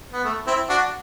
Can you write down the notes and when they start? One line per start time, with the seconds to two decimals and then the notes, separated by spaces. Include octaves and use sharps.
0.13 B3
0.24 A3
0.47 C4 E4
0.69 D4 F#4